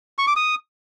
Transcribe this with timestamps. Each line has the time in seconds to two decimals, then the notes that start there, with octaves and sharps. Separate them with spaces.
0.18 C#6
0.27 D6
0.36 D#6